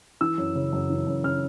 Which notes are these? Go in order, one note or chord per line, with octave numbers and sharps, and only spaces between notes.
E3 E6
F#2
C#3
F#2
E3
F#2
C#3 F6